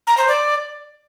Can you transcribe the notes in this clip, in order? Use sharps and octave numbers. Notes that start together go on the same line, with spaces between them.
A#5
C5
D5